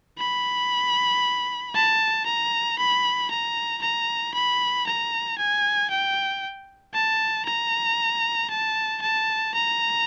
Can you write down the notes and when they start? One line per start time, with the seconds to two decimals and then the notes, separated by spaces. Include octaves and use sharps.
0.18 B5
1.75 A5
2.26 A#5
2.78 B5
3.31 A#5
3.82 A#5
4.34 B5
4.87 A#5
5.38 G#5
5.90 G5
6.94 A5
7.45 A#5
8.50 A5
9.02 A5
9.54 A#5